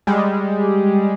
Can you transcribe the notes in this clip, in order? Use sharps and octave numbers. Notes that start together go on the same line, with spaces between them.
G3 G#3